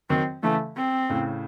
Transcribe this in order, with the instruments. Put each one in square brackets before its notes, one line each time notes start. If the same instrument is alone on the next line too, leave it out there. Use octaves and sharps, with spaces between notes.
[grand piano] D#3 F#3 [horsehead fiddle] C4
[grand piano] C#3 E3 [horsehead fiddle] A3
[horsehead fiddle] C4
[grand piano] A2 C#3